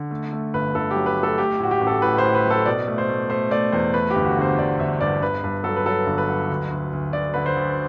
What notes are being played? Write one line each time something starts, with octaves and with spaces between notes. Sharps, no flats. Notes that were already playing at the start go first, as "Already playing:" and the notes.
Already playing: D3
A3
A3
G1 B4
G1 A4
G4
F#3
B4
A3
A4
A3 G4
A2 F#4
G4
A1
A4
A2 B4
C5
A2
B4
F#3
A4
B2 D5
A3
C5
A3
A3 C5
A3 D5
E2 C5
A3 B4
G4
G1
F#4
D3 C5
G1 D5
G1 E5
G2 D5
G1 B4
G2 B4
F#3 A4
B4
F#3 A4
G1
B4
F#3
D2
D2
D2
D2 D5
D3 B4
C5
D2